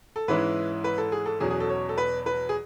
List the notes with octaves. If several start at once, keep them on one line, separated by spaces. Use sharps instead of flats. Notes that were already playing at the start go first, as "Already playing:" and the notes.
A4
G#2 E3 G#3 C#4 E4 B4
B4
A4
G#4
A4
E2 B2 F#3 C#4 G#4
G#4
A4
C#5
A4
B4
B4
G#4